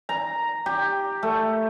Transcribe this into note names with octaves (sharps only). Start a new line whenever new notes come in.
A#5
G4
A3